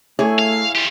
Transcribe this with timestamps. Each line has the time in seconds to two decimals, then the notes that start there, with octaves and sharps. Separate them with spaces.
0.19 A3 E4 G#4 C#5
0.39 F5
0.75 F4 G4